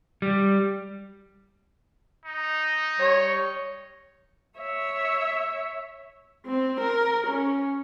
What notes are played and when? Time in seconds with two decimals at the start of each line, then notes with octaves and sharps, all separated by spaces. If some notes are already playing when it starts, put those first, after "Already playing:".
0.22 G3
2.25 D#4
2.99 G3 C#5
4.59 C#5 E5
6.46 C4
6.80 A#4
7.27 C#4